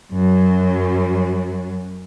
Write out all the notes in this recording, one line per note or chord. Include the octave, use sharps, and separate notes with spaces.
F#2 F#3